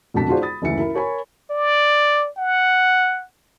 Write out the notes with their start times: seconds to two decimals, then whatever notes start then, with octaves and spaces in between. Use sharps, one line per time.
0.14 E1 F2 D3 F#4 A5 B6
0.28 D#4 F4 F#4 G#4 C5 D5
0.41 B5 D#6 A6
0.62 F#1 D2 E3 E5 C#7
0.78 E4 A#4
0.94 A#4 C#5 G#5 B5
1.51 D5
2.37 F#5